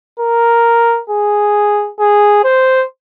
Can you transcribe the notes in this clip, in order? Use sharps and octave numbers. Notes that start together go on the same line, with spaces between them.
A#4
G#4
G#4
C5